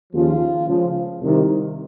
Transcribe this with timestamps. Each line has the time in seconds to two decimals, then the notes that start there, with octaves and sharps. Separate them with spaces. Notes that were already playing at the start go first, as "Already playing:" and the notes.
0.13 D#2 C#3 F3 F4
0.67 C#2 C#3 F3
1.21 C2 C3 D#3